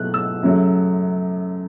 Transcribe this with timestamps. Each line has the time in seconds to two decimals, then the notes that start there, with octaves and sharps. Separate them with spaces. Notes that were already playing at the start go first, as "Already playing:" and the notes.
Already playing: B2 F#3 A3 F#6
0.14 E6
0.42 F#2 C#3 F#3 A3